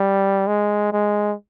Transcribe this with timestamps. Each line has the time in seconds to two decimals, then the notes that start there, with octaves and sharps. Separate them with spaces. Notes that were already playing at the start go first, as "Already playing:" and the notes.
Already playing: G3
0.47 G#3
0.93 G#3